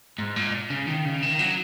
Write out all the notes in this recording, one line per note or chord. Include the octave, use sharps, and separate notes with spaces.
G#2
A#2
C#3
D#3
C#3
D#3
F#3